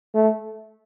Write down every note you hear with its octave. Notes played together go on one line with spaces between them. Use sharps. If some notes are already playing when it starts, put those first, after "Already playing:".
A3